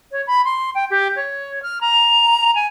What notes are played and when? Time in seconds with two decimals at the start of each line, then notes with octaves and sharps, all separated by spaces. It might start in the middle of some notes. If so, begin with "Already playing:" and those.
0.12 C#5
0.27 B5
0.45 C6
0.75 G5
0.90 G4
1.16 C#5
1.63 F6
1.81 A#5
2.55 G#5